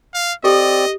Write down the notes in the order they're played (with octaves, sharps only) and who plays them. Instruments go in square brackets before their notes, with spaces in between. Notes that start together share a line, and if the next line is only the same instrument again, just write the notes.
[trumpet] F5
[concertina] C4 D5 [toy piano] G4 A4 [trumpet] D#5